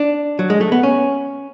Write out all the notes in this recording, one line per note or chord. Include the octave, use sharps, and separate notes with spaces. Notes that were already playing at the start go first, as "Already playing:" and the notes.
Already playing: D4
F#3
G#3
A3
B3
C#4